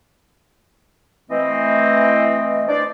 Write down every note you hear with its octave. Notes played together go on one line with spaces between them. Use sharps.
E3 A3 C4 D#5
D4 C5 D5